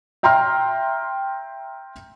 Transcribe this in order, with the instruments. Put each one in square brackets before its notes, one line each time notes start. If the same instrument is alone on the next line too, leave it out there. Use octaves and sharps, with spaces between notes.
[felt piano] E5 G5 A#5 C6 F6